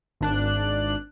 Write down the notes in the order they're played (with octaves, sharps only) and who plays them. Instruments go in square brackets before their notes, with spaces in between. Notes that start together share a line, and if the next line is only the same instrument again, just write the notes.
[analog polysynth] G#1 D4 F#6